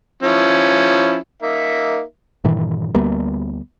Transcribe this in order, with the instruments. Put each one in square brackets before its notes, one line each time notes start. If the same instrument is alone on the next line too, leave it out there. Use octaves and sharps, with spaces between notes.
[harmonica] F3 C#4 E4
A#3 D#4 E5
[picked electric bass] G2 A#2 D#3 E3
D2 G3 A#3 B3